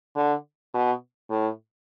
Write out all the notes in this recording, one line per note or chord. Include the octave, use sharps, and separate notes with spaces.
D3
B2
A2